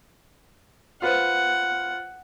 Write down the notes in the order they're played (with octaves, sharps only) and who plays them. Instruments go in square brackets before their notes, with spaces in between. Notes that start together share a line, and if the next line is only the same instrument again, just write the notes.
[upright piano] F4 B4 C5 [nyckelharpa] F#5